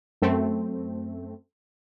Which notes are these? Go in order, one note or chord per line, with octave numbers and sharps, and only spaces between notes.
F#2 A3 C4